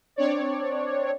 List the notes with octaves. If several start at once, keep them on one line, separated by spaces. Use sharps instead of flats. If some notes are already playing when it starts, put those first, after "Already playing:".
C4 D4 C#5 D5